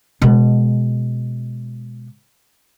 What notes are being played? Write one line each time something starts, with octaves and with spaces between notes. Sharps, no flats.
B2 G#3